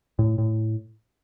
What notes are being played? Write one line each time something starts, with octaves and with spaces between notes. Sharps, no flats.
A2
A2